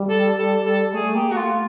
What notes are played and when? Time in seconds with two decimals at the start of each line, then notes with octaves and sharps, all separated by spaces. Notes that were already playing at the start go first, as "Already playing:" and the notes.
Already playing: G3
0.09 A4
0.38 A4
0.66 A4
0.94 A3 G#4
1.15 A#3 G4
1.32 F#4
1.36 A3 F4